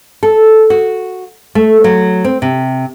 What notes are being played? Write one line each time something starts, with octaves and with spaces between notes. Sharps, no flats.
A4
F#4
A3
F#3
C4
C3